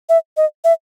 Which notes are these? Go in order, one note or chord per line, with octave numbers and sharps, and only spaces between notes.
E5
D#5
E5